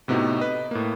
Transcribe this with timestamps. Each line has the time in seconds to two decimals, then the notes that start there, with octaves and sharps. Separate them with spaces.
0.08 A2 C3 B3 D#4 F#4
0.40 B4 D#5
0.71 A2 A#3